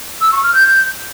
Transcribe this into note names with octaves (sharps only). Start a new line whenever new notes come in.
E6
C#6
F6
G6